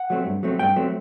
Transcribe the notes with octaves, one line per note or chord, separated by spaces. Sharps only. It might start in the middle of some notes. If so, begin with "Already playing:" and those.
Already playing: F#5
F#3 A3 C4
G2
F#3 A3 C4
G2 G5
F#3 A3 C4